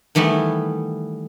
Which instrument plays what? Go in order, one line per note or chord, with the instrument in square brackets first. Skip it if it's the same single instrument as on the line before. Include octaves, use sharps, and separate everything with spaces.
[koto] D#3 E3 G3 A3 B3